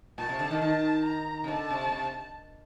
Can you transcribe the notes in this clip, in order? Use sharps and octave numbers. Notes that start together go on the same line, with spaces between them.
A#2 A5
C3
D3
D#3
D#3 A5
A#5
C3
D3 A5
C3
C3